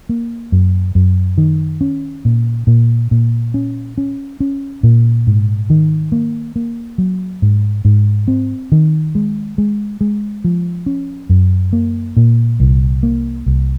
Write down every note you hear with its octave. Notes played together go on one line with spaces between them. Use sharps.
A#3
F#2
F#2
D#3
C#4
A#2
A#2
A#2
C#4
C#4
C#4
A#2
G#2
D#3
A#3
A#3
F#3
G#2
G#2
C4
D#3
G#3
G#3
G#3
F3
C#4
F#2
A#3
A#2
C2
A#3
C2